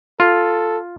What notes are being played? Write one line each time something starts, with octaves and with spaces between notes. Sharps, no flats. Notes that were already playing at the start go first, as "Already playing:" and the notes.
F4 A4